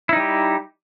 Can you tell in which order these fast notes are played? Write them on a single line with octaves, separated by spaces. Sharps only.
E4 D#4 G3 G4